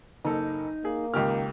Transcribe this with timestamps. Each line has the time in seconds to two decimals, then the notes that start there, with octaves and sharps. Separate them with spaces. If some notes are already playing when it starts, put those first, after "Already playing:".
0.25 F#1 A#3 D#4 A4
0.85 A#3 G#4
1.14 C#2 D#3 G4 F6